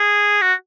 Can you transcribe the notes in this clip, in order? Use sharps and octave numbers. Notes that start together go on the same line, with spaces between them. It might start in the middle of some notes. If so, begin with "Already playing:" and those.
Already playing: G#4
F#4